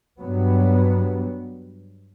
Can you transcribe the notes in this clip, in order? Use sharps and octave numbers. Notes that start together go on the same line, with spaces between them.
G2 F#3 B3